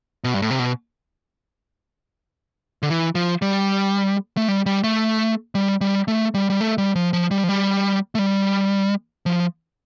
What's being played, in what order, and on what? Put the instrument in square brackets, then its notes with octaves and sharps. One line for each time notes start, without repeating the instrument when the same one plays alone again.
[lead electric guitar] B2
G2
A2
C3
B2
D3
E3
F3
G3
A3
G3
G3
A3
G3
G3
A3
G3
G3
A3
G3
F3
F3
G3
F3
G3
A3
G3
F3